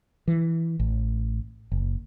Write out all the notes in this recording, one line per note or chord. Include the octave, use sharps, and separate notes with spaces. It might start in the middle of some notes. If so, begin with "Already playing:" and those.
E3
A1
F#1